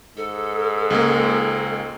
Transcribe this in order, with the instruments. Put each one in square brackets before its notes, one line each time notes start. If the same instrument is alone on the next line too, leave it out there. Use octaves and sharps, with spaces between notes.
[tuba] G#2 [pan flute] A4
[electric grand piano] C#2 G#3 A#3